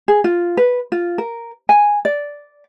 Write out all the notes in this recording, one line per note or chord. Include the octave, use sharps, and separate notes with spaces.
G#4
F4
B4
F4
A#4
G#5
D5